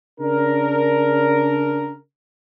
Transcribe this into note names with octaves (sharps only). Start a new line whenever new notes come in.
C#3 D4 A#4